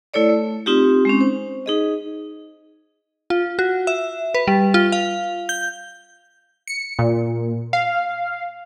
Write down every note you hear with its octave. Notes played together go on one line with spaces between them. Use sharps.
A3 E4 A4 C#5 D5
A3
C4 D#4 F4 G4
G#3 C4 C#4
C5
D#4 G#4 D#5
F4
F#4
E5
B4
G3
F4
F5
G6
C#7
A#2
F5